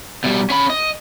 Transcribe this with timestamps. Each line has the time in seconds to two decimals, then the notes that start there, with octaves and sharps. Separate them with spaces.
0.24 B2 G3
0.50 C#4 B5
0.70 D#5